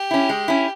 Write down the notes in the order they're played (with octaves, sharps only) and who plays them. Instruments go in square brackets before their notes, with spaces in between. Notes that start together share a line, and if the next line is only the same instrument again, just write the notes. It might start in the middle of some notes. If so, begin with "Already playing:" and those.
Already playing: [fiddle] G4
[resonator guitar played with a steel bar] C#4 E4
G#3
C#4 E4